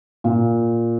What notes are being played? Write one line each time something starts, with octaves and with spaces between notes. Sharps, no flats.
A#2